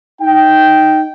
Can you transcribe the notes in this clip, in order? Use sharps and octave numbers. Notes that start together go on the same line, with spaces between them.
D#4 G5